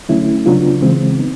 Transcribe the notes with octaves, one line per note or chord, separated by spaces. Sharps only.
D3 F#3 A3 C#4 E4
C#3 F#3 B3 D4 F4
C#3 E3 G#3 C4
B3 D#4